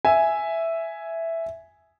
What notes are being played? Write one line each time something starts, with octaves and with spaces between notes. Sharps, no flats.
E5 G#5